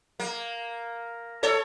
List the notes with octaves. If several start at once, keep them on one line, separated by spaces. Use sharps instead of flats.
A#3
A4 C#5